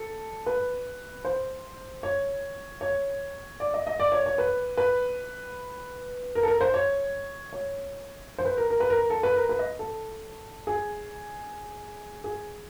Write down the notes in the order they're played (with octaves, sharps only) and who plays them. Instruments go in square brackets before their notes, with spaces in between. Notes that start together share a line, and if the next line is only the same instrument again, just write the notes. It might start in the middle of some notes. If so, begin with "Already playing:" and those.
Already playing: [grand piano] A4
B4
C5
C#5
C#5
D5
D#5
D#5
D5
C#5
C#5
B4
B4
A#4
A4
A#4
C5
C#5
C#5
C5
B4
A#4
A#4
B4
A#4
A4
B4
A#4
B4
D#5
A4
G#4
G#4